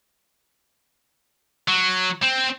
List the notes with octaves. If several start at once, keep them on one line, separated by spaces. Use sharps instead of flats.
F#3
C4